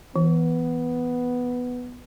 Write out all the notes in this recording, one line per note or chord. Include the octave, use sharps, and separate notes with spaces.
E3 B3